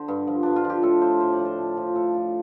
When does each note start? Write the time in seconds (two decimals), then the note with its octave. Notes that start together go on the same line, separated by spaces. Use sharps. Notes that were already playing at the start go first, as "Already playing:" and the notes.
Already playing: D3 C5
0.08 G2
0.27 F3
0.43 G2 D4
0.56 F4
0.64 F3
0.70 G4
0.83 A2 A4
1.02 F3 C5
1.20 A2 C5
1.33 D5
1.39 F3
1.45 C5
1.58 A2
1.77 F3
1.95 A2 A4
2.14 F3